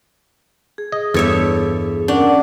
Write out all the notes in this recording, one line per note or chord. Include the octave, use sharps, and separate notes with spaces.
G#4
D#5
E2 G2 A4 C#5 E5
C#4 D4 A#4 F#5